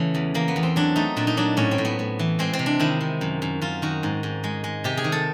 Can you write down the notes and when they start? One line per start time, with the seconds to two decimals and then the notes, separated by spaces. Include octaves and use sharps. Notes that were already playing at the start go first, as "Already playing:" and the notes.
Already playing: C#3 E3 A3
0.15 E2
0.34 E2 A#3
0.48 B3
0.56 E2
0.63 C4
0.76 F#3 D4
0.96 A3 D#4
1.17 A#2 D4
1.27 D#4
1.37 F#3 D4
1.57 A2 C#4
1.71 C4
1.78 A2
1.85 B3
1.99 A2
2.19 E3
2.39 G#3 C4
2.53 C4
2.59 C3
2.66 D4
2.80 D#3 E4
3.01 C3
3.21 F#2
3.42 F#2
3.61 F#2 F4
3.82 D#3 F#4
4.03 G#2
4.23 G#2
4.44 G#3
4.64 G#3
4.84 C3 G4
4.97 G#4
5.04 D#3
5.12 A4